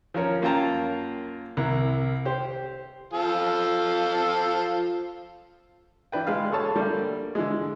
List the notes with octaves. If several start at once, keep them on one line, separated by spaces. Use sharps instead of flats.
F3 C#4 A#4 C#5
F#2 A#3 F4 G5 A5 A#5
C2 E4 A#4
G4 C5
F3 F4 A4
E3 D4 B4 G5
G#3 B4 F5
G#4 A4 C#5 A5
D3 G3 A3 A#3 D4
D3 E3 G#3